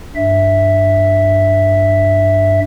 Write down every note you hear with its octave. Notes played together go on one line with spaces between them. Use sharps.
G2 E5